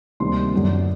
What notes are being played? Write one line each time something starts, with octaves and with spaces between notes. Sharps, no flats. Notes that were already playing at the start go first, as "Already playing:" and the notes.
D2 C3 D#3 G3 A#3 C6
F#2 D3 F#3 A3